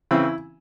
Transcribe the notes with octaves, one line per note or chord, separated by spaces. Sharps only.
C#3 E3 C4 E4